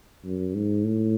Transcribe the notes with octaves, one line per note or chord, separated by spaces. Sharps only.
F#2
G#2
A2